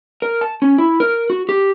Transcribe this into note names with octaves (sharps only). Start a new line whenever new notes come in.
A#4
A5
C#4
E4
A#4
F#4
G4